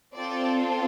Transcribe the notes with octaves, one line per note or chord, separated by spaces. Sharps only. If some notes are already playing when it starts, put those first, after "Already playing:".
C4 F4 A4 D5